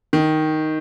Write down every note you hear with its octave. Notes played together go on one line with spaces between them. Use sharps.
D#3